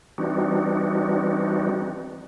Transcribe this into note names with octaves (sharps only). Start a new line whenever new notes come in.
E3 G3 C4 D4 D#4 F#4